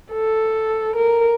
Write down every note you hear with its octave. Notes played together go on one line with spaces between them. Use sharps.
A4
A#4